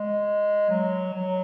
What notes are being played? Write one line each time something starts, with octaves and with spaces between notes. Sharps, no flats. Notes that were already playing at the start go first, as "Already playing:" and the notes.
Already playing: G#3
F#3
F#3